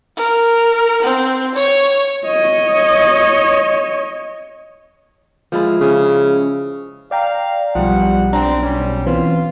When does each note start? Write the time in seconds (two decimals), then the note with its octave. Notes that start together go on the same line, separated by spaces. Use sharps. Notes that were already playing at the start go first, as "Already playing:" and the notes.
0.17 A#4
1.02 C4
1.55 C#5
2.25 C#5 D#5
5.52 F3 G#3 E4
5.81 C#3
7.11 D5 F5 G5 A#5
7.75 B1 F3 G3 F#5
8.33 C4 D4 A#5
8.63 G3 C#4
9.06 E3 B3 C4 F4